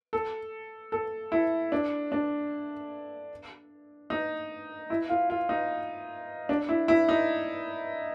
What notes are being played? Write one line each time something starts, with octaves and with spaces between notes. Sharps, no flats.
A4
A4
E4
D4
D4
D#4
E4
F4
F4
D#4
D4
E4
E4
D#4